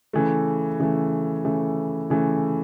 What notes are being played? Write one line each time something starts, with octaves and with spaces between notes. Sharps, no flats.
C#3 E3 A3
C#3 E3 A3
C#3 E3 A3
C#3 E3 A3